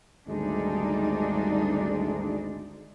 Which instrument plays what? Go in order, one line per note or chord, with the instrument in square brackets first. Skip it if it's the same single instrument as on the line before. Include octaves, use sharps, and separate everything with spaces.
[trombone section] G#1 D2 G#3 [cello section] G3 D4 D#4